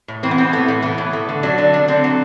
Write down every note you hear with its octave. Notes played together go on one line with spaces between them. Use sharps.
A2
E3 C4
B3
A2 C4
A3 B3
A2 A3
E3 B3
A2
A3
D3
F#3 D4
D3 D4
A3 D4
D3 C4
F#3